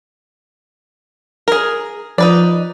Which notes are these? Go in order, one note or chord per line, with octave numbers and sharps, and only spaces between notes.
G#4 A#4
F3 D#4 B4 D5